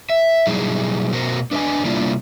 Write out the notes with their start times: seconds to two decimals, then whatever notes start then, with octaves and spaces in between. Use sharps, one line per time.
0.10 E5
0.47 B2 F#3 G3 D#4 E4 G#4
1.12 B2 F#4 A#4 C5
1.51 D4 B4 C#5 D#5 G#5
1.85 C3 G3 A#3 D4 E4 F4